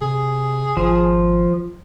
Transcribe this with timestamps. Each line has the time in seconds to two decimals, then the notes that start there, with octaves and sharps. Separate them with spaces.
0.01 C3 G#4
0.77 G#1 F3